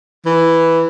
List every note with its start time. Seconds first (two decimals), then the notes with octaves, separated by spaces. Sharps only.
0.26 E3